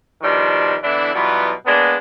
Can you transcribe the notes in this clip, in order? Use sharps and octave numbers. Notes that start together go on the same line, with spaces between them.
B2 D#3 F3 G3 D4 C6
D3 E3 B3 D4 E4
B2 E3 F#3 G3 B3 F4
G#3 A#3 B3 D4